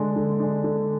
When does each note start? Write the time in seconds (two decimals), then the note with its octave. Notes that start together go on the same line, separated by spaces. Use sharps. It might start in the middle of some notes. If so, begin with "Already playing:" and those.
Already playing: D3 G#3 D4
0.16 D3
0.40 G#3 D4
0.64 D3